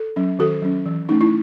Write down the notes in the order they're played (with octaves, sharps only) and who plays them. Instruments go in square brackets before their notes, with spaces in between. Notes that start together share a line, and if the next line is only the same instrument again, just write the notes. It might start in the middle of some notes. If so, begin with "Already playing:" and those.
Already playing: [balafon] A4
F#3 C#4
D#3 F#4 A4
F#3 C#4
E3
A3 C#4 D#4
E4